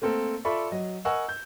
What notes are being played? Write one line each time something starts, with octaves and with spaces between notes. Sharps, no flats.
A3 A#3 C4 A4 A#4
F4 A4 D5 E5 B5 C#6
F#3 D#5
A#4 D#5 F#5 G#5 C#6 E6
G6